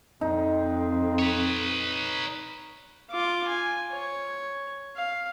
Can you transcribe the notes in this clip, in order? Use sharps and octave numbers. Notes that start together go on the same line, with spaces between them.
F2 C4 D#4
B4 C#5
F4 D6
G#5
C#5
F5